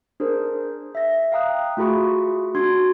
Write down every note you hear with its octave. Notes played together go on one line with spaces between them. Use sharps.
D4 G#4 A#4 C5
E5 A#6
F5 G5 A#5 D#6 F#6
A3 F4 F#4 G#4 B5 C#6
D4 F#4 C6 G#6